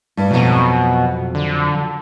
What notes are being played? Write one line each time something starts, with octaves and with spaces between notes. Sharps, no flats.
G2
F2 B2 F#3
D3